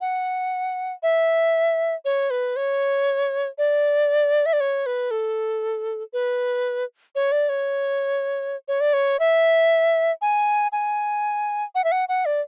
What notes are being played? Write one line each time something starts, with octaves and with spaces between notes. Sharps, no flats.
F#5
E5
C#5
B4
C#5
D5
E5
D5
C#5
B4
A4
B4
C#5
D5
C#5
C#5
D5
C#5
E5
G#5
G#5
F#5
E5
F#5
F#5
D5